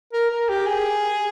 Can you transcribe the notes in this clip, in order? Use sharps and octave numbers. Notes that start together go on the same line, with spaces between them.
A#4
A#4
G4
G#4